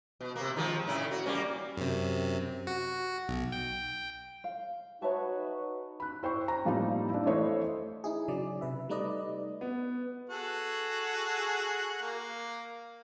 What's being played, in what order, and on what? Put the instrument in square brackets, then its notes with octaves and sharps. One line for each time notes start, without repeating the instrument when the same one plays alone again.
[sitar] B2
C3 A#3
D#3 F3 G#3
A2 C#3 E4
F#4
G3 A#3 C#4
[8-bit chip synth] F#2 C3
F#4
B1
G5
[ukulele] F5
[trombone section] D#4 F#4 B4 [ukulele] C#5 E5 A5
[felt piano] B5 F#6
E4 C5 G5 C#6
A#5
A2 F3 G3 A#3 C4 D#4
D4 E4
E3 A3 C5 C#5 D#5 E5
[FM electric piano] D#4 E4 G#4
C#3 F#3 D5
C3 B4 E5
G3 A3 D#4 B4 D5 D#5
[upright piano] B3
[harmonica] F#4 G#4 A4
A#3